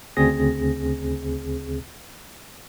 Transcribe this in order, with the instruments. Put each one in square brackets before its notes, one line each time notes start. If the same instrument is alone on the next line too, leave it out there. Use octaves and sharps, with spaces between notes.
[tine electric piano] D2 C#3 C4 G#4 A#6